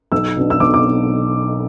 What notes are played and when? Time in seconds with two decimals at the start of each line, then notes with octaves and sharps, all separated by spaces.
0.12 B1 E6
0.37 B2 B3 D4
0.50 E6
0.60 B1 D6
0.74 D6